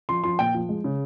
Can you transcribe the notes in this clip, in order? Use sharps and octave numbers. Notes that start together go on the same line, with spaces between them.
F3 C6
F3 C6
A#2 G5
F3
G#3
C#3